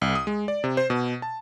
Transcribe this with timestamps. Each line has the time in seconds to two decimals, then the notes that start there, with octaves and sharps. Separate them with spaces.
0.02 C2
0.15 D#6
0.27 G#3
0.48 D5
0.64 C3
0.77 C5
0.90 B2
1.22 A5